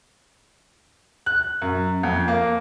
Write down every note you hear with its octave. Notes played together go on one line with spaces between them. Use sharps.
F#6
F#2
F2
A#3